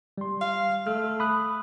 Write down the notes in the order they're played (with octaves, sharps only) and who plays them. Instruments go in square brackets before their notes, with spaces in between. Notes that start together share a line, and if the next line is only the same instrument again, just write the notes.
[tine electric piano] G3 C6
[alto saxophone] F5
[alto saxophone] A3 [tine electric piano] F6
[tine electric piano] B5 D#6 F#6